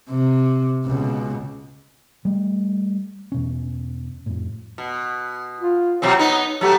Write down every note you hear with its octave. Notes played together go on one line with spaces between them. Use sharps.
C3
C#2 B2
G3 A3
E2 B2 C#4
F2 A2
B2
F4
B2 F#3 C4 C#5
B3 D#4
F#3 A3 B3 G4